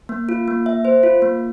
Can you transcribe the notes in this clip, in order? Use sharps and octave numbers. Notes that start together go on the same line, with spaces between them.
A#3
F4
A#3
E5
C5
F4
A#3